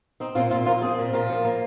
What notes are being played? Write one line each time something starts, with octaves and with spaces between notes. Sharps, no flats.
C4 D#4
A#2 C4 F4
A#2 C4 F4
F3 F4 A#4
C4 G#4 C5
A#2
A#2 F4 A#4
F3
A#3